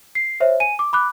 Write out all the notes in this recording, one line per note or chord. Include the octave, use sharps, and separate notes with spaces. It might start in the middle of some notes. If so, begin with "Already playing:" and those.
C7
C5 C#5 E5
G#5 D#7
D6
B5 D6 F#6